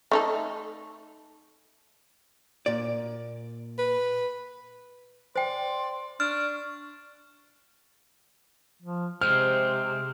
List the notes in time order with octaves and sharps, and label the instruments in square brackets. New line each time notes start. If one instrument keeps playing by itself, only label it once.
[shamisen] A3 D#4 A4
[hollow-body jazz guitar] A#2 D5
[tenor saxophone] B4
[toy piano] C5 G5 [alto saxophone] D5 [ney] C6
[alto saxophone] D4 [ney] C#6 [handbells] F6
[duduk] F3
[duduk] C3 [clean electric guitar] G#3 C4 [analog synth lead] C5 [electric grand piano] F6